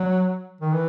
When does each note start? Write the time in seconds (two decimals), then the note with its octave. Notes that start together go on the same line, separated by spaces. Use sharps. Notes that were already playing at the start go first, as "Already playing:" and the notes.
Already playing: F#3
0.61 D#3
0.73 E3